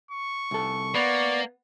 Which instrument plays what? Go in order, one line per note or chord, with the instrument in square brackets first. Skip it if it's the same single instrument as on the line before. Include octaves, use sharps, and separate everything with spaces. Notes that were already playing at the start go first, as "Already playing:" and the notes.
[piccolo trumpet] C#6
[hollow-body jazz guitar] C2 A4
[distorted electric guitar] A#3 [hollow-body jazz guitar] B3 B5 [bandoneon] D5